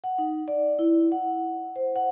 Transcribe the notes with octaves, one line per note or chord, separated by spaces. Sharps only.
F#5
D#4
D5
E4
F#5
C5
F#5